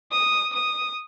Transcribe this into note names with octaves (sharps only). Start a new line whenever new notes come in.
D#6
D#6